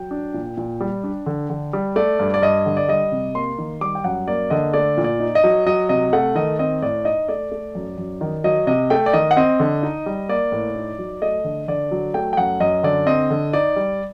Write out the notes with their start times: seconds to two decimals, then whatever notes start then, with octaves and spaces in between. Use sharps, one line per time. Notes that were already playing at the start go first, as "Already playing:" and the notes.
Already playing: F#3 G5
0.11 D4
0.34 A#2
0.57 A#2
0.80 G3
1.04 D4
1.26 D3
1.50 D3
1.73 G3
1.96 A3 D5
2.19 G2
2.34 D5
2.42 G2 D#5
2.66 D3
2.77 D5
2.88 G3 D#5
3.12 C3
3.35 A#3 C6
3.58 D#3
3.81 G3 D6
3.95 G5
4.04 F#2 F#5
4.28 A#3 D5
4.50 D3 D#5
4.73 A3 D5
4.97 A#2
5.04 D5
5.20 D#4
5.35 D#5
5.44 F#3
5.66 F#3 D#5
5.89 C3 D#5
6.13 A3 F#5
6.35 D#3 D#5
6.59 C4 D#5
6.82 A2 D5
7.05 D#4 D#5
7.28 A3 D5
7.51 A3
7.75 F#2
7.98 F#2
8.21 D#3
8.44 F#3 D#5
8.67 C3 D#5
8.90 A3 G5
9.06 D5
9.13 D#3 D#5
9.31 F#5
9.37 C4 D#5
9.60 D3
9.83 D#4
10.06 G3
10.29 A#3 D5
10.52 A2
10.76 D#4
10.99 F#3
11.22 A3 D#5
11.44 D3
11.68 D3 D5
11.91 F#3
12.14 A3 G5
12.33 G5
12.37 F#2 F#5
12.60 F#2 D#5
12.83 D3 D5
13.07 C4 D#5
13.30 D3
13.53 D#4 D5
13.76 G3